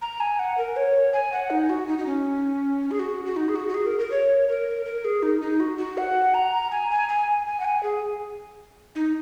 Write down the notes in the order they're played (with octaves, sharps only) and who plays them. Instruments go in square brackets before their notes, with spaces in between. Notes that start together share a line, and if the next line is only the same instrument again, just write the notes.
[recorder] A#5
G#5
F#5
A#4
C#5
G#5
F#5
D#4
F#4
D#4
D#4
C#4
G#4
F#4
F#4
D#4
G#4
F#4
F#4
G#4
A#4
A#4
C#5
A#4
A#4
G#4
D#4
D#4
F#4
F#4
F#5
A#5
G#5
G#5
G#5
G#5
F#5
G#5
G#4
D#4